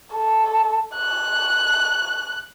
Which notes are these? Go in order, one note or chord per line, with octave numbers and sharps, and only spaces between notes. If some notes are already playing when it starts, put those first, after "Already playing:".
A4
F#6